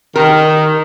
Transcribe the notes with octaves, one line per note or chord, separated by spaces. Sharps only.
D#3 A#4